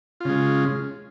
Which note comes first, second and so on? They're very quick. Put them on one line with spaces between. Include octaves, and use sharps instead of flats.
F4 C#3 G#3